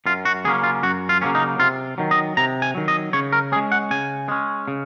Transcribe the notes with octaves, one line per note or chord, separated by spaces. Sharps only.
F#2 F4
F#4
C#3 F#3 A#3 C#4 G#4
F4
F#2 F#4
F4
C#3 F#3 A#3 C#4
D#4
C3 F4
D#3 F#3
D#5
C3 A#5
G#5
D#3 F#3
D#5
C#3 C#5
A#4
G#3 C#4 G#4
F#5
C#3 G#5
G#3 C#4
C#3